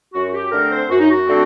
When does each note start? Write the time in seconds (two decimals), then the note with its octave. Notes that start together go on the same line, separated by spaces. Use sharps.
0.14 F#2 F#4
0.28 F#4
0.33 G4
0.51 D3 A3 C4 A#4
0.71 C5
0.89 F#2 F#4
0.99 D#4
1.10 F#4
1.26 D3 A3 C4